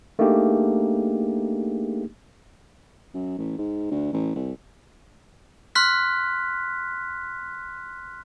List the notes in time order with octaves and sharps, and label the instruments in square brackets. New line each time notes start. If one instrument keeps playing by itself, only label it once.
[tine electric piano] A3 A#3 D4 D#4 G4 G#4
[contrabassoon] F#2
A1
G#2
D2
A1
C2
[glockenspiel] C6 F6 F#6 B6